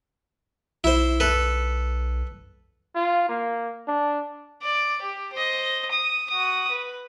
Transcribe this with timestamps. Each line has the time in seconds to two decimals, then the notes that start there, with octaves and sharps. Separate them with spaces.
0.84 B1 E4 C5
1.20 A4 B4
2.96 F4
3.29 A#3
3.88 D4
4.63 D5
5.02 G4
5.33 C5 D#5
5.91 D#6
6.29 F#4 D#6
6.70 B4